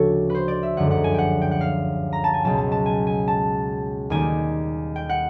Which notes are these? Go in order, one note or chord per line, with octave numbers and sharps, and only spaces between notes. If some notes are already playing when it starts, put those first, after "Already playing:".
Already playing: D2 C#3 F3 G#3 F#4 A4 C#5
B4 C5
D5
E5
G1 F#2 D3 F3 G#3 F#5
F#5
G#5
F#5 G5
G5
F#5
F5
A#5
A5
G#5
C#2 B2 F#3 A5
A5
A5
G#5
G#5
A5
D#2 D#3 G3 G#5
G5
F#5